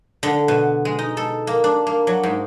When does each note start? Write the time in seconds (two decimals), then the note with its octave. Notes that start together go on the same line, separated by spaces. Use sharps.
0.23 D3
0.48 B2
0.85 G#3
0.99 D#4
1.17 A4
1.47 A#3
1.64 D4
1.87 A#3
2.07 F#3
2.23 G#2